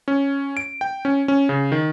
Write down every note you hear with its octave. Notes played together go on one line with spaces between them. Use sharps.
C#4
D7
G5
C#4
C#4
C#3
D#3